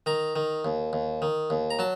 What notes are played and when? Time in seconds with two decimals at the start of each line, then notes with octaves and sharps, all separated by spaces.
0.06 D#3 A#5
0.36 D#3
0.65 D#2
0.93 D#2
1.22 D#3
1.50 D#2
1.70 A#5
1.79 F#3 A5